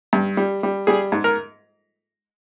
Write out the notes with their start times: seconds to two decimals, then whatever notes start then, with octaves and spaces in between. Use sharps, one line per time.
0.13 G2
0.37 G3
0.63 G3
0.87 G3 G#4
1.12 G#2
1.24 A#4